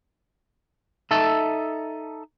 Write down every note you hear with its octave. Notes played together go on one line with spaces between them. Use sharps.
D#4 A4 E5 A5